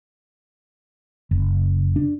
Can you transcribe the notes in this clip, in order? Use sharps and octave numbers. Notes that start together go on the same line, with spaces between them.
F#1
D4